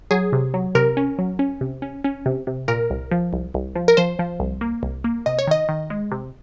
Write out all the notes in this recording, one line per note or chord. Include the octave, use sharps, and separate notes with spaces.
F#3 G#4
C3
F#3
C3 A#4
C#4
F#3
C#4
C3
C#4
C#4
C3
C3
A#2 A#4
C2
F3
C2
C2
F3
A#4
F3 C5
F3
C2
A#3
C2
A#3
C3 D#5
C#5
D#3 D#5
D#3
G#3
C3